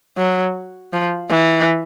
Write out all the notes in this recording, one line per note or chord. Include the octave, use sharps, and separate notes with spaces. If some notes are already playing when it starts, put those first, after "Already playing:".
F#3
F3
E3